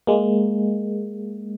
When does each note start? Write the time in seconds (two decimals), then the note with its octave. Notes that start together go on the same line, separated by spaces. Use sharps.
0.07 G#3 A#3